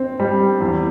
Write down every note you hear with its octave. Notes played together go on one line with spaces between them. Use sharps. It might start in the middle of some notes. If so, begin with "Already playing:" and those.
Already playing: C4
G3
E2